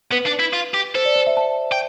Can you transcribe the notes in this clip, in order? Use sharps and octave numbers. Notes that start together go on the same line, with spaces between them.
B3 B4
D4
E4
F4
G4
A4 C5
D5
C5
E5
A5
G5